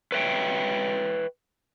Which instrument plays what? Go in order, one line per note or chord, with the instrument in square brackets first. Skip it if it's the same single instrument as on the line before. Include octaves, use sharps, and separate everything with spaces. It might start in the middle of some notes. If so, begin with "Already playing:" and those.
[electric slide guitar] B4 C#5 E5 G5